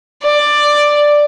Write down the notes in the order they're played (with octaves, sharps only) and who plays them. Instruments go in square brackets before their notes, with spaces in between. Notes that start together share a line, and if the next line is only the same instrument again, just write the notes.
[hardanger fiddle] D5